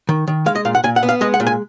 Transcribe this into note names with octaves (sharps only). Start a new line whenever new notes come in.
D#3
D#3
G#3 F5
D#5
A#2 F5
F#5
A#2 G#5
F#5
B3
F5
G#3 D#5
F#5
A#2
G#5